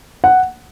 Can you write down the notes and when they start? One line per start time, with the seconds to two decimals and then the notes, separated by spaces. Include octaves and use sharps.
0.24 F#5